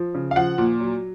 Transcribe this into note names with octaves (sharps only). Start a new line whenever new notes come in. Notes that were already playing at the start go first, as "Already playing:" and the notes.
Already playing: F3
C#3
F5
F3 F#5
A#2
F#3